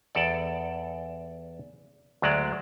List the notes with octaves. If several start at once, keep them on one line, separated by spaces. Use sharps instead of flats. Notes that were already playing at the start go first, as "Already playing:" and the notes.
E2 A4 D5
D2 F#3 G#3 D5